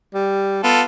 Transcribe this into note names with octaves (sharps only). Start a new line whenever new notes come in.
G3
B3 F4 A4